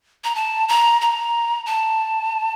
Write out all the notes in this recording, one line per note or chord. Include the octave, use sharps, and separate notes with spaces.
A#5
A5
A#5
A#5
A5